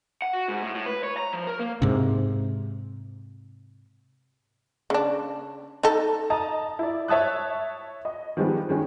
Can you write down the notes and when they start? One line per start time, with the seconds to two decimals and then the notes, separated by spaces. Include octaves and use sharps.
0.22 F#5
0.33 F#4
0.49 G#2
0.63 A2
0.75 A2
0.86 B4
1.04 C#5
1.17 A#5
1.33 F3
1.47 A#4
1.59 A#3
1.82 G#2 C3
4.90 C#3 D4
5.83 D#4 A4
6.30 D#5 A5 A#5 D#6
6.79 E4 D5
7.08 C#5 E5 A5 D#6 F#6
8.05 D#5
8.37 D#3 F3 G3 G#3 B3
8.69 D#3 G#3 C#4